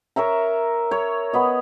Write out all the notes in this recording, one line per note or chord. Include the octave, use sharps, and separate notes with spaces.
A#4 C#5 E5 A#5
C#5
B3 B4 D#5